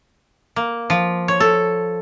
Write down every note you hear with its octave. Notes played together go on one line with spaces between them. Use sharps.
A#3
F3
C#5
A4